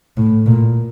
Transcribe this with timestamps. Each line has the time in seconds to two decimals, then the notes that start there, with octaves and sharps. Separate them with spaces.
0.17 A2
0.46 A#2